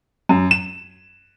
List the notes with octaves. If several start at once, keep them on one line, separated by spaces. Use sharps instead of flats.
F#2
E7